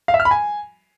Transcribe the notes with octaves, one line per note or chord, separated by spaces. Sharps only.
F5
E5
F6
B5
G#5